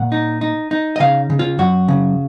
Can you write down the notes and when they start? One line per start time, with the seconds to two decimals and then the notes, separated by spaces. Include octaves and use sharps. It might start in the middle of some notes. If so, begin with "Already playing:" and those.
Already playing: A#2 F#5
0.12 D#4
0.41 D#4
0.71 D#4
0.96 D#5
1.00 C#3 F5
1.30 C#3
1.39 F4
1.58 F#2 F#4
1.88 C#3